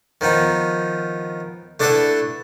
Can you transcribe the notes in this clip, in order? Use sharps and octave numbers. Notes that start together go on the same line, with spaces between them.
D#3 F3 B3 D#4
A3 D4 E4 A4 B4 F#5